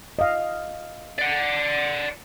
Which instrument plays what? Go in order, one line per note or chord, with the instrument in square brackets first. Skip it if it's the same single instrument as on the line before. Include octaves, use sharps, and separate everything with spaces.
[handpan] D#5 F5
[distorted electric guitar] D5 F#5